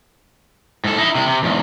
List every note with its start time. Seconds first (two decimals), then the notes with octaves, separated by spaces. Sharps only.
0.84 G#2 A4
0.98 D#4 E4
1.15 C3 E4
1.27 C3
1.43 E2 G#2